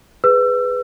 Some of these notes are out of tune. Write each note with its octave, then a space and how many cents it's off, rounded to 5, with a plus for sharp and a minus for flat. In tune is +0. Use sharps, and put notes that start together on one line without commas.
G#4 +0 B4 +10 E6 +30